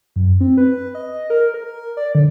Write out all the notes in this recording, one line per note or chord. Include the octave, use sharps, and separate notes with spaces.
F#2
C4
B4
D#5
A#4
A#4
D5
D3